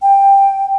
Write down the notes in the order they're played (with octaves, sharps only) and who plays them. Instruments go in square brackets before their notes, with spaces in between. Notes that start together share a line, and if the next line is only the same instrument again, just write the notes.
[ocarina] G5